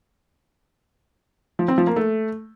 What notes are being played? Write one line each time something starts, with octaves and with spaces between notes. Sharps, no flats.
F3
C4
F3
A#3
A3